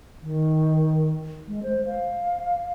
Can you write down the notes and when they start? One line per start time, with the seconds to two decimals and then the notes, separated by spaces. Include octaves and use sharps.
0.22 D#3
1.48 G#3
1.63 C5
1.86 F5